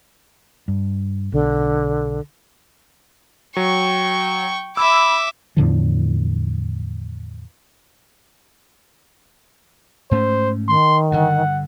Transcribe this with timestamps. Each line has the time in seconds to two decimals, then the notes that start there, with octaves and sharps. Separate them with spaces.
0.68 G2
1.32 B1 D3
3.57 F#3 G5 C#6
4.77 E5 B5 D6 E6
5.57 E2 A2 D3 F3
10.11 G#2 A3 C#4 C5
10.68 D#3 C6
11.12 G2 D3 F#5